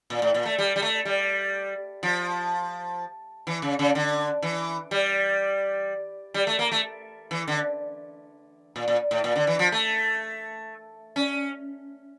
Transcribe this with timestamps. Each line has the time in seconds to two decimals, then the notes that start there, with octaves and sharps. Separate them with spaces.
0.10 A#2
0.22 A2
0.34 A#2
0.45 A3
0.58 G3
0.76 G3
0.82 A3
1.05 G3
2.03 F3
3.47 E3
3.62 C#3
3.79 C#3
3.95 D3
4.43 E3
4.91 G3
6.34 G3
6.47 A3
6.59 A#3
6.72 A3
7.31 E3
7.48 D3
8.76 A#2
8.88 A#2
9.11 A2
9.24 A#2
9.36 D3
9.47 E3
9.59 F3
9.72 A3
11.16 C#4